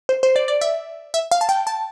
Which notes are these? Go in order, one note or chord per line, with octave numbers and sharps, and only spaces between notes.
C5
C5
D5
D5
E5
E5
F5
A5
G5
A5